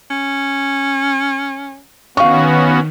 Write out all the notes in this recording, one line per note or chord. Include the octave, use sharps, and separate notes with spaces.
C#4
D#3 B3 C#4 F#4 F5 C#6